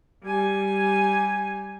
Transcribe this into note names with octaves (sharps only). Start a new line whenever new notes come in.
G3 G#5